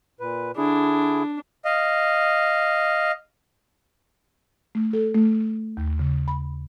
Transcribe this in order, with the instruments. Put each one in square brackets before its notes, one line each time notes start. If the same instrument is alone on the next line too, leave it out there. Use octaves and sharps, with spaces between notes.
[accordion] A#2 B4
[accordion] D3 E4 G#4 [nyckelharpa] D4
[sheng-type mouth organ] D#5 F5
[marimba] A3
A4
A3
D#2
C#3
B5